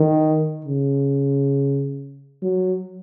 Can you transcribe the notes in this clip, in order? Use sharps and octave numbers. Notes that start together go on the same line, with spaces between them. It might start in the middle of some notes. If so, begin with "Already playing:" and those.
Already playing: D#3
C#3
F#3